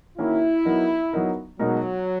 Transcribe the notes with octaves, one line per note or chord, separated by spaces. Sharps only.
D#3 A#3 C#4 E4 F#4
F#3 B3 D#4 A#4
F#3 B3 D#4 A#4
B2 F#3 G#3 D#4 A#4